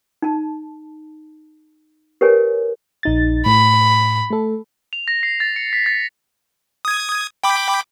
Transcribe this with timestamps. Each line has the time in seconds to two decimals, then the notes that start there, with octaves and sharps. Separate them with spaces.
0.22 D#4 A5
2.21 G4 A#4 B4 C#5 G#5
3.03 A#1 D#4 A6
3.46 A2 B5
4.30 A3 A4
4.93 F7
5.08 A#6
5.23 C7
5.40 A6
5.56 C#7
5.73 B6
5.86 A6
6.85 D#6 G#6
7.44 G5 B5 D6